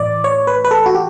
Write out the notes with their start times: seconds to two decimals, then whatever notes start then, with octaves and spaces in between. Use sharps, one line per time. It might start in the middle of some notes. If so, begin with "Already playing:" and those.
Already playing: A2 E3 D5
0.24 C#5
0.47 B4
0.65 B4
0.71 A4
0.86 F#4
0.95 G4